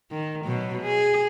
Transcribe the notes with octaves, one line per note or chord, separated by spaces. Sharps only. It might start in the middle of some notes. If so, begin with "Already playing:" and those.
D#3
B2 F#3
G#4